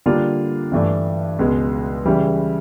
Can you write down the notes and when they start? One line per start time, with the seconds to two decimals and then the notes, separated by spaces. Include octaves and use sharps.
0.06 D3 G3 A#3 D4 F4
0.72 G2 E3 A3 D4
1.39 C#2 B2 G#3
2.05 C#3 E3 G3